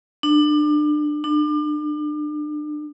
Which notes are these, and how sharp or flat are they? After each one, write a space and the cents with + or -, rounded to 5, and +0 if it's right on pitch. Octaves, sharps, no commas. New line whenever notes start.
D4 +30
D4 +35